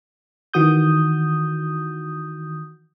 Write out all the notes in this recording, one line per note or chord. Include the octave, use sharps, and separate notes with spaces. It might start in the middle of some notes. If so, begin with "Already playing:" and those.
D#3 E3 F#4 D#6 G6